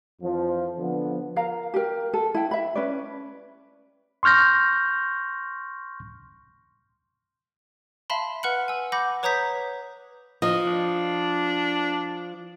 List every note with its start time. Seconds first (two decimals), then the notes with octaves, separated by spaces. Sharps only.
0.21 F2 E3 F3
0.78 D3 F3 B3
1.36 A#4 F5 A#5
1.74 G4 A#4
2.14 A4
2.34 E4 G5
2.51 E5 B5
2.75 C#4 B4 D5
4.23 C6 C#6 F6 G6 A#6
8.10 E5 F5 A5 B5 C6
8.43 B4 F#5 F6 F#6 C#7 F#7
8.68 G#5 E6
8.92 F#5 B5 D6 G6 A#6
9.23 B4 C#5 A#5 D#6 G6 B6
10.42 F3 D#5
10.67 D4